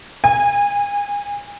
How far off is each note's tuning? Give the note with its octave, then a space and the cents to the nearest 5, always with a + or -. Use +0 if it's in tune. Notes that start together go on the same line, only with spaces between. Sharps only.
G#5 -25